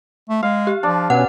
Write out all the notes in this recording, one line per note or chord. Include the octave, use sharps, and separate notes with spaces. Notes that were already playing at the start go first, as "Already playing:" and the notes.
A3
G#3 F5
G4
F3 D4
B2 C#4 B4 F#5